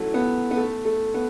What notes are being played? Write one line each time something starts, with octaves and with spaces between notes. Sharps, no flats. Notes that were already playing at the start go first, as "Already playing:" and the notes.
Already playing: C#3 E3 F#3 A3
B3
B3
A3
A3
B3